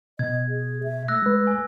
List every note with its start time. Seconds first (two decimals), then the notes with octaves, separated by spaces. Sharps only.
0.19 B2 D#5 G#6
0.48 G#4
0.83 E5
1.08 A3 E6 F#6 A#6
1.22 G#3 B4
1.47 G#5